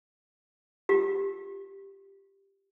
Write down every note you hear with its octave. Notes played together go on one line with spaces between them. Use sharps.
F4 G4